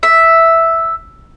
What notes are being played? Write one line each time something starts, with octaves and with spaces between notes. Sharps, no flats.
E5